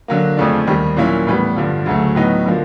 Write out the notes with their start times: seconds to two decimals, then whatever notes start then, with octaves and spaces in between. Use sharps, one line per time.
0.08 D3 F#3 A#3
0.37 F2 C#3 F3 A3 D4
0.67 D#2 D#3 G3
0.97 A#2 F#3 A#3 C#4 E4
1.27 A2 E3 G3 B3
1.56 G2 D3 F3
1.86 D2 C#3 F#3 A3
2.15 A2 F#3 B3 D#4
2.46 D3 F3 A#3